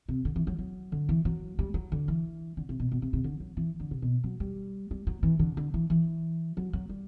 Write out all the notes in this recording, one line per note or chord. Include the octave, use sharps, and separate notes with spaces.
C3
D3
E3
F#3
F#3
D3
E3
F#3
G3
F#3
D3
E3
D3
C3
B2
B2
C3
C3
D3
F#3
E3
D3
C3
B2
F#3
G3
G3
F#3
E3
D3
D3
E3
E3
F#3
F#3
G3